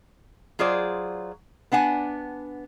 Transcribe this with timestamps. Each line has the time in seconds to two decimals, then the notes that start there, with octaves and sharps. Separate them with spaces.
0.59 F#3 F4 G#4 C5 D5
1.72 B3 D4 F#5 G#5